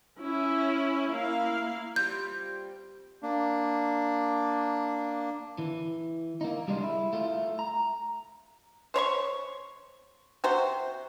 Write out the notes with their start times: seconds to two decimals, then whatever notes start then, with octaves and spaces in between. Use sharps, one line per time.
0.20 C#4 E4
1.13 A#3 E4 F5
1.96 G3 C4 F4 G6
3.23 A#3 D4
5.58 E3
6.41 A#3 D#4
6.68 C2 G3 G#3 D4 F4
6.83 E4
7.13 A3 F4
7.59 A#5
8.94 C5 C#5 B5 C#6
10.44 C3 F#4 C5